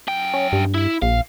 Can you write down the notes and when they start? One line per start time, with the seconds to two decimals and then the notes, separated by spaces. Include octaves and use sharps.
0.08 F#2 G5
0.34 C#4
0.52 G2
0.74 E4
1.02 A#1 F5